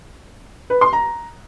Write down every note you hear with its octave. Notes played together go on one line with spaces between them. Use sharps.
B4
C6
A#5